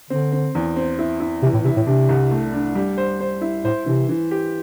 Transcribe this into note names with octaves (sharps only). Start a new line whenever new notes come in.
D3 C4
C4
E2
C4
E4
E4
C3 E3
A2
C3 E4
A2
C3 D4
C2
A3
D4
G3
C5
C5
E4
A2 C5
C3 E3
E3
G4